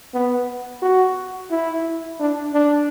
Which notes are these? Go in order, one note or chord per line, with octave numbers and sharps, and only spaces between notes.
B3
F#4
E4
D4
D4